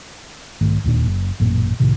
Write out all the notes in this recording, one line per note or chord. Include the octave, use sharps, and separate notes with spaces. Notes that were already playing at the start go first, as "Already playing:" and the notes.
B1 G#2 D#3 A3
E1 D#2 A#2 D4
F#1
A1 F#2 A#2 A#3
C2 A2 C3 D#3